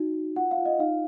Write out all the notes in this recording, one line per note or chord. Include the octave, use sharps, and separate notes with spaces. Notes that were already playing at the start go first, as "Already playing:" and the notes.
Already playing: D#4 F#4
D#4
F4 F#5
F5
F4
D#5
D#4 F5